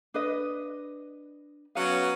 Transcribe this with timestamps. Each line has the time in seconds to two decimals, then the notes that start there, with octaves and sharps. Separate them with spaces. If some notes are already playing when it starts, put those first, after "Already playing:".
0.14 D4 B4 D#5
1.75 F#3 B3 C#4 F5